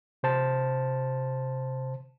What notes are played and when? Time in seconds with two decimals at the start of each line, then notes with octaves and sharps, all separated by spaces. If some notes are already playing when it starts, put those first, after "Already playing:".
0.23 C3 C5 A5